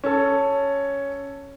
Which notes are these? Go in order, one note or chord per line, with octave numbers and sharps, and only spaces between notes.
C#4 A4